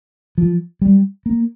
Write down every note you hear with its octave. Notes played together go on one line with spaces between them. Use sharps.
F3
G3
A#3